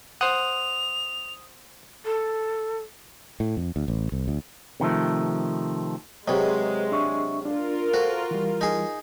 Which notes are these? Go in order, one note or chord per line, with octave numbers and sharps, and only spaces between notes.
C5 F#5 D#6 F7
A4
A2
F2
D2
A1
C2
D2
C3 D#3 F3 A3
C3 F#3 G#3 B4 C5 D#5
D4 E5 C#6
D4 F4 A#4
F#4 A4 C5
E3 G3
D#4 G#4